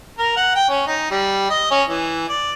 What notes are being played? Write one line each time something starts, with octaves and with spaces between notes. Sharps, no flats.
A#4
F#5
G5
C#4
D#4
G3
D#5
C#4
E3
D5